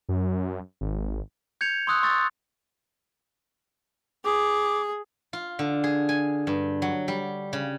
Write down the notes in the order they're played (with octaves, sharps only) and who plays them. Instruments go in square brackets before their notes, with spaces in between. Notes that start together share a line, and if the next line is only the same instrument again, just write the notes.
[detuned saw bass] F#2
G#1
[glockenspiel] G6 G#6 C#7 F7
C6 C#6 D#6 E6 F#6
C6 C#6 E6 A6
[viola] G#4 [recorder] D6
[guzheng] F4
D3
G#4
G#5
G2
F#3
G3
C#3